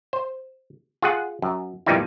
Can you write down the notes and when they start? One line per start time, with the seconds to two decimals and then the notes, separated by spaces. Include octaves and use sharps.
0.13 C5
1.02 F4 G#4 F#5
1.42 F#2
1.86 F2 A#2 E3 G3 D#4 E4